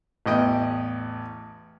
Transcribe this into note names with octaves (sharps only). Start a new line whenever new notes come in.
A1 E2 D#5 G5